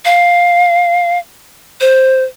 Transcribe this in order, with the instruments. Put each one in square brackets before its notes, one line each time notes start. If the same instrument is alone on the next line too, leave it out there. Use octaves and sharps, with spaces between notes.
[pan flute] F5
C5